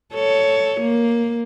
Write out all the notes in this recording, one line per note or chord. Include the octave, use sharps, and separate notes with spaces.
A4 C#5
A#3